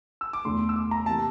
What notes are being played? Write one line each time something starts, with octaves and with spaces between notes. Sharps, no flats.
E6
D6
E2 D3 A3 C6
E6
D6
A#5
C3 E3 A#3 A5